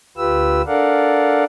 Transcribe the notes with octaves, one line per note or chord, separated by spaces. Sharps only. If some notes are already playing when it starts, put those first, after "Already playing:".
D2 F4 G4 B4 E6
D4 A4 A#4 D5 F5 F#5